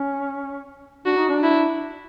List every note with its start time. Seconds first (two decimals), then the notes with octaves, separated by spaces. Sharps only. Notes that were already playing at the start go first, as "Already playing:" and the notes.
Already playing: C#4
1.06 D4 F#4
1.17 D#4
1.29 D4
1.43 E4